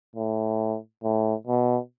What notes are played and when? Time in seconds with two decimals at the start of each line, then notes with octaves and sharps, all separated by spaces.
0.16 A2
1.04 A2
1.47 B2